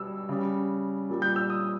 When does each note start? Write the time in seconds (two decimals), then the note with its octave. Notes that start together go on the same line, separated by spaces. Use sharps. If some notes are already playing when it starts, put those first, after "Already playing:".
Already playing: B2 G3 E6
0.29 C#3 G3
1.10 A#2 G3
1.22 G6
1.36 E6
1.50 D#6